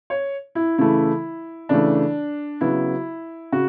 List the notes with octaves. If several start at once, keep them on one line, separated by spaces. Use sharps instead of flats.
C#5
E4
C#3 E3 A3 E4
C#3 E3 A3 D4
C#3 F#3 B3 E4
C#3 F#4